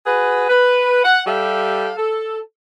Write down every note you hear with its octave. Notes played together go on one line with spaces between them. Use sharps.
F#4 G#4 B4
B4
F#5
G3 G4 A4 E5 F5
A4